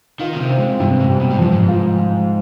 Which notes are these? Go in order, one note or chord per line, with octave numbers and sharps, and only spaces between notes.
D#3 F4
B2
C3
C4
G#2
G2 C3
G#2
G3
B2
G#2
G2 F3
G#2
F4
F3